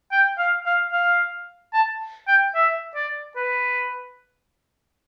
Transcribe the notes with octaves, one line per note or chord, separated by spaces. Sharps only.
G5
F5
F5
F5
A5
G5
E5
D5
B4